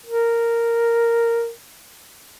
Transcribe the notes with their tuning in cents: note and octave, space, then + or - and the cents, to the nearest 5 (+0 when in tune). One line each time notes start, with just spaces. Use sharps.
A#4 -5